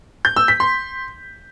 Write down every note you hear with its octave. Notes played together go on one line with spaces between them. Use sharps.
G6
E6
B6
C6